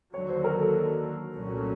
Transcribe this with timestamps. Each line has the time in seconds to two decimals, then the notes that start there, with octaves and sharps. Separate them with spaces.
0.14 D#2 D3 F#3 C#5
0.29 C5
0.44 A#4
0.59 A4
1.34 C2 A#2 F#3 A3 C#4